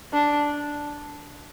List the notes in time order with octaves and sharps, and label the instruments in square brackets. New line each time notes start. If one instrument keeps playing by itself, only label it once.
[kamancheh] D4